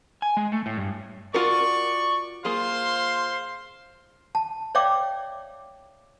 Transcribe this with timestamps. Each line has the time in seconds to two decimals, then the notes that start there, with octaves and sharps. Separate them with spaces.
0.22 G#5
0.37 G#3
0.52 A3
0.66 A2
0.78 G2
1.34 F4 F#4 A#4 D5 C#6
2.45 A#3 F4 G#4 C5 F5 C6
4.35 A5
4.75 C#5 D5 E5 F5 G5 D6